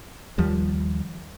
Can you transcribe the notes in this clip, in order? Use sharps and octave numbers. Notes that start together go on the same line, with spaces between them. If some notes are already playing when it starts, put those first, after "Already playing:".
D#2 F3 G3